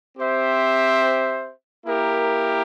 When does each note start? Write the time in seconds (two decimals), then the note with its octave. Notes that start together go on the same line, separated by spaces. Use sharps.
0.18 C4 G4 C5 E5
1.86 A#3 E4 G4 A#4